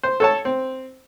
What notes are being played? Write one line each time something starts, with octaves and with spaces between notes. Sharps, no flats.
C5
A4 C#5 A5
C4